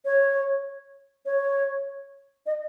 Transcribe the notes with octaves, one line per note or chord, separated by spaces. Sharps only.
C#5
C#5
D#5